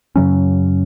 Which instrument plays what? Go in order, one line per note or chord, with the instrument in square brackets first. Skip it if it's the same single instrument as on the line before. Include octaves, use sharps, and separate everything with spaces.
[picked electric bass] F#2 C#3 F#3 C#4